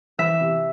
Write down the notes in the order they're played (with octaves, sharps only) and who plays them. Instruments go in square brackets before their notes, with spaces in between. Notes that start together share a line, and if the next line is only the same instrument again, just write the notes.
[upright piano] E3 [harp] E5
[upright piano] C3